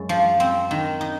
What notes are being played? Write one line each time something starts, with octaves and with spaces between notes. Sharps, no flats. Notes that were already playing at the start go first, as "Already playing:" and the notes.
Already playing: F#2 G#3
F3
C4
D#3
D#4